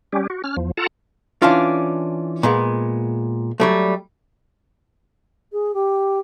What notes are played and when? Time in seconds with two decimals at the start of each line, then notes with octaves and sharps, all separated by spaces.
0.13 G3 C#4 G4
0.30 F#4
0.44 C#4 F6
0.57 E2 F3
0.77 F4 A4 F#5 A5 A#5
1.42 E3 C#4 D4 F4
2.43 A#2 G#3 B3
3.60 F#3 G3 A3
5.52 G#4
5.74 G4